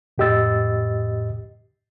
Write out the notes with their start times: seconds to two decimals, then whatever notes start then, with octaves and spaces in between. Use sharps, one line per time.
0.18 F2 A2 G4 D#5 E6 A6